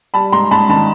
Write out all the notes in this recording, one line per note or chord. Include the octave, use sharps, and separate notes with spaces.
G3 A5 B5
G#2 A#5 C6
G#2 A5 B5
D#3 A5 B5